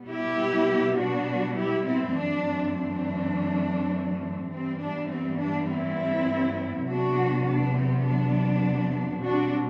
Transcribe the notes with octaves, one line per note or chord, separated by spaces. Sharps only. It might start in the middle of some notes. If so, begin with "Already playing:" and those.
Already playing: B2 G3 B3
E4 G4
D4 F#4
E4 G4
C4 E4
F#2 E3 A3 C4 D4
D4
G2 E3 G3 B3 C4
D4
C4
D4
C4 E4
E2 C3 F#3 B3 D4 F#4
D4
C4
D4
B2 G3 C4 D4 F#4